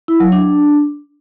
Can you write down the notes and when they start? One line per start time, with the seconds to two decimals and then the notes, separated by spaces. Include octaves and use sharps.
0.08 E4
0.20 F#3
0.32 D4